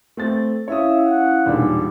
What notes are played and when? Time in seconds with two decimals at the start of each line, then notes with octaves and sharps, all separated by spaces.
0.17 A3 C4 A6
0.68 C#4 E4 C#5 E5 F5 D#6
1.03 F#5
1.46 E1 A#2 G3 D4 D#4